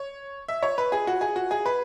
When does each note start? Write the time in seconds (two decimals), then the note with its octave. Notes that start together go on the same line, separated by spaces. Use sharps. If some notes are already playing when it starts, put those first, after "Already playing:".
Already playing: C#5
0.48 E5
0.63 C#5
0.78 B4
0.92 G#4
1.07 F#4
1.21 G#4
1.36 F#4
1.51 G#4
1.66 B4